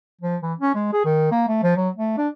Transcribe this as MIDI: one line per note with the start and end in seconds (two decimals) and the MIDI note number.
0.21 0.37 53
0.42 0.54 52
0.59 0.74 61
0.75 0.88 56
0.93 1.04 68
1.05 1.30 51
1.31 1.44 58
1.48 1.60 57
1.63 1.76 53
1.76 1.89 54
1.96 2.16 57
2.17 2.28 62